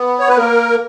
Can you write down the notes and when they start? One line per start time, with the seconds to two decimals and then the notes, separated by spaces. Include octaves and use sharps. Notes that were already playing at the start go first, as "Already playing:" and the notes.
Already playing: B3
0.19 C#5
0.29 B4
0.38 A#3 A#4